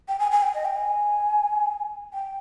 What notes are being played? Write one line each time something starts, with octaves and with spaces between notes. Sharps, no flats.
G5
G#5
G#5
G5
D#5
G5
G#5
G5